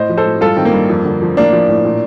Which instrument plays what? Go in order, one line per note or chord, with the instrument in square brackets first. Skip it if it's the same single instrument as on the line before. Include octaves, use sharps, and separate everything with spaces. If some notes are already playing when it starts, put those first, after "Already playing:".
Already playing: [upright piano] A2 C5 D#5
F3
A4 C5
A2
G2 F4 A4
D#3 C4
A#3
G2
F2
D3
F3
A2 A#3 D4
F3
A2
A#2